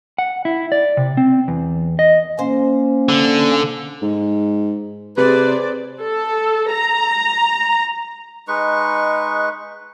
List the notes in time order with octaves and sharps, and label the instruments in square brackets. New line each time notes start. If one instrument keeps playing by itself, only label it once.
[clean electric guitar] F#5
E4
D5
C3
C4
E2
D#5
[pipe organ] A#3 C#4 [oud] C5
[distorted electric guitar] D3
[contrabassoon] G#2
[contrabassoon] C3 [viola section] G#4 C5 D5 [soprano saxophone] B4
[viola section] A4
A#5
[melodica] G#3 D#4 B4 C#6